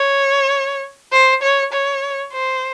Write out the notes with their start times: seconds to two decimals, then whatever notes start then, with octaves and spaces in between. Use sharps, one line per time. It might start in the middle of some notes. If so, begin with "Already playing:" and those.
Already playing: C#5
1.12 C5
1.42 C#5
1.72 C#5
2.33 C5